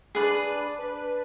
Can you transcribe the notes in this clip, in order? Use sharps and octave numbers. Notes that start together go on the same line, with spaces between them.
D4 G#4 B4 D5
B4